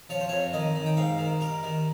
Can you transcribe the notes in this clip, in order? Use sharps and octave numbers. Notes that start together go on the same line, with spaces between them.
F3 C#5
C5
F2 C#5
D#3 D#5
D#3
G5
G#2 F5
D#3
G3 A#4
D#3